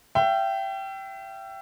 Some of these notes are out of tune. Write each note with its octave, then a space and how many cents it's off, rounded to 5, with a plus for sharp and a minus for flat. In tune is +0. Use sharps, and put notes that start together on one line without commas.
E5 +35 G5 -15